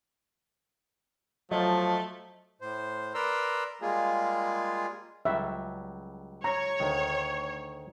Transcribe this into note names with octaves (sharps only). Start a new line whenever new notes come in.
F3 F#3 A3 D#5
A2 C5
A#4 B4 D5 A#5 C6 E6
G3 G#3 A#3 F4 G#4
C#2 F#3 G3 E5
C#5 A#5
D2 D#3